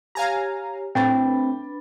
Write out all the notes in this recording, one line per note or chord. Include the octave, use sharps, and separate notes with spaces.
G4 C#5 F5 G#5 A#5
A2 C4 D4 B4 G5 B5 A6